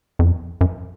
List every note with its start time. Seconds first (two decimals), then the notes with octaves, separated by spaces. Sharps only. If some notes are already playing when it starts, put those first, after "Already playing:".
0.19 F2
0.61 F#2